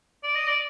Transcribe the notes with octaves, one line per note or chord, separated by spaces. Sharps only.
D5
D#5
D5